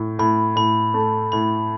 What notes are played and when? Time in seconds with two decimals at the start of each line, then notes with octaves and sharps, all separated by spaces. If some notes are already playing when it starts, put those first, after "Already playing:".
Already playing: A2
0.19 A2 B5
0.56 A2 B5
0.94 A3
1.32 A2 B5